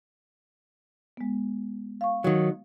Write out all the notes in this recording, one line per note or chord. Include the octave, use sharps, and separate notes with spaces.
G#3 B3
F5 C#6
D#3 F#3